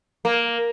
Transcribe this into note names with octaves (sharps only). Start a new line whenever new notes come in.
A#3